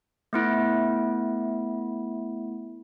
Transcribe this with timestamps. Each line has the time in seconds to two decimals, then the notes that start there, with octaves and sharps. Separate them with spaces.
0.33 A3 B3 E4